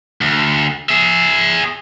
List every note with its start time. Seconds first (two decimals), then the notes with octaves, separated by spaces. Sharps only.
0.21 D2
0.89 G#4 E5